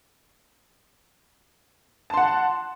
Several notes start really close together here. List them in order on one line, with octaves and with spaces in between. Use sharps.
A5 C6 F#5